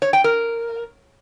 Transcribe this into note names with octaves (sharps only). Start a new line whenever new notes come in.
C#5
G5
A#4